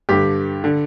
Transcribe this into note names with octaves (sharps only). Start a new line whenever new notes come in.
G2 D3 G4
D3